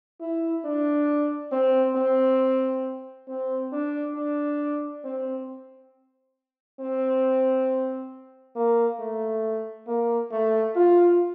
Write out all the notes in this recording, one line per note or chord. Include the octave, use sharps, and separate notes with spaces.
E4
D4
C4
C4
C4
D4
D4
C4
C4
A#3
A3
A#3
A3
F4